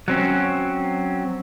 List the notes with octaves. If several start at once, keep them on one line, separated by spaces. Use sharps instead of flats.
F#3 C4 C#4